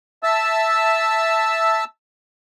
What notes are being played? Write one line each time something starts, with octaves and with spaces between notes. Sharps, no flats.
E5 A5 E6